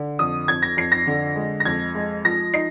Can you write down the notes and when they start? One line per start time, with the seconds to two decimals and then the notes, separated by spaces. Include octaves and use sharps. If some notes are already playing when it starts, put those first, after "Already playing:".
Already playing: D3
0.19 F2 D#6
0.48 F2 G#6
0.62 A#6
0.77 F2 C7
0.92 A#6
1.06 D3
1.36 G#3
1.60 A#6
1.65 F2 G#6
1.95 G#3
2.25 F3 A#6
2.54 D#4 C7